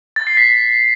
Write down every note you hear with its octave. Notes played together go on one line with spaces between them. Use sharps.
A6
C7
B6